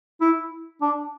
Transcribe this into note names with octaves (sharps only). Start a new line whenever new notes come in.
E4
D4